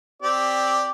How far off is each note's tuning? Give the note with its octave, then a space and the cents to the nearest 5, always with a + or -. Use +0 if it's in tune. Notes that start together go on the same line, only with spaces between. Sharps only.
C4 +0 G4 +5 D5 +0